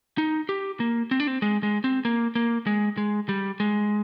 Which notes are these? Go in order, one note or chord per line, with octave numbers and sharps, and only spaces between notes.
D#4
G4
A#3
C4
D4
C4
G#3
G#3
C4
A#3
A#3
G#3
G#3
G3
G#3